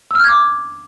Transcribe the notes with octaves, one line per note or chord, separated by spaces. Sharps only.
D6 E6 F6 G6 G#6